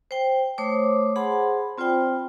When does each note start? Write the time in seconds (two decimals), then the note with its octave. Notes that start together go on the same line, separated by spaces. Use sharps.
0.11 C5 G5
0.58 A3 C5 C#5 D6 D#6
1.16 G#4 C5 F#5 A5 B5 C6
1.78 C4 F4 C5 D5 G5 B5